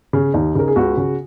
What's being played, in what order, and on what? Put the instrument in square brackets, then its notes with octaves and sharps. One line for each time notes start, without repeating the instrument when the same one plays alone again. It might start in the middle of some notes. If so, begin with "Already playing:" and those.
[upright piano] C#3
D#2 D#4
C#3 A#4
G#4
C#2 F#4
C#3